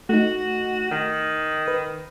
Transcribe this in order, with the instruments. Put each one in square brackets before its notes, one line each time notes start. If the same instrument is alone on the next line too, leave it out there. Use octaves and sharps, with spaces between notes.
[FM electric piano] A3 D#4 [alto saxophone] F#4
[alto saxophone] D#3
[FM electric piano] B4